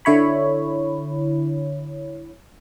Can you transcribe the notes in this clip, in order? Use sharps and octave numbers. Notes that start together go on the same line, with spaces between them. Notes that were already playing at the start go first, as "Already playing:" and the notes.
D3 E4 C#5 B5